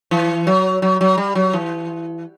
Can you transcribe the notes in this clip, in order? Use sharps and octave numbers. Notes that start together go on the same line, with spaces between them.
E3
F#3
F#3
F#3
G3
F#3
E3